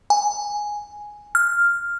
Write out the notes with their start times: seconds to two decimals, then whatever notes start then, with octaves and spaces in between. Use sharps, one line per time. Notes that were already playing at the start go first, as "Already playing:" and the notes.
0.10 G#5
1.35 F6